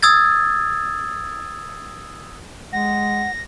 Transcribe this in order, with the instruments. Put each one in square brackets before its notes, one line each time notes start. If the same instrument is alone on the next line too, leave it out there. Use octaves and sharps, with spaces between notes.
[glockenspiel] D#6 E6 G#6 A6
[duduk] G#3 [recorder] F#5 [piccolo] A#6